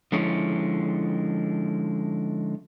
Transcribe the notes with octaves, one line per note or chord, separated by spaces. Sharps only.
D3 F3 G#3 C#4 E4